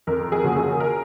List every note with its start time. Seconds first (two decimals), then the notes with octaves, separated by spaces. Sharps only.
0.07 F2 A#4
0.32 G#4
0.44 C#3 F3 A#3 F#4
0.56 G#4
0.80 A#4